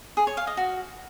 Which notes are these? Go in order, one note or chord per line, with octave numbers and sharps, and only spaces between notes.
G#4
C#5
F5
D#5
F#4